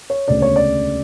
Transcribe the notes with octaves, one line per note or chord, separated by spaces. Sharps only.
C#5
E1 D2 C#3 D5
C#5
D5